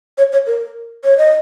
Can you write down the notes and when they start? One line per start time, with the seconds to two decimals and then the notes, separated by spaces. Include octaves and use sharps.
0.18 C#5
0.33 C#5
0.47 A#4
1.04 C#5
1.18 D#5